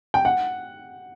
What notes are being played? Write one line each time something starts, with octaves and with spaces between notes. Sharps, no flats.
G5
F#5